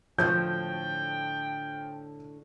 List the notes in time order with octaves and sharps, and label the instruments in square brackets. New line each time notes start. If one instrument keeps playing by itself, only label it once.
[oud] A2 D3 F#4 [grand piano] F3 [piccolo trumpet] G5 [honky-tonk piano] G6